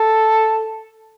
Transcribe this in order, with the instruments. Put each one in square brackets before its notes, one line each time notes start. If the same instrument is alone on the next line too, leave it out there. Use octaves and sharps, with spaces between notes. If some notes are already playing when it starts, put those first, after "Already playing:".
Already playing: [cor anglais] A4